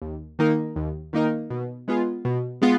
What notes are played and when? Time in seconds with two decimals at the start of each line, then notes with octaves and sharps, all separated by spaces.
0.02 D#2
0.39 D#3 A#3 D#4 A#4
0.76 D#2
1.13 D#3 A#3 D#4 A#4
1.50 B2
1.88 G#3 B3 F4 G#4
2.25 B2
2.61 G#3 B3 F4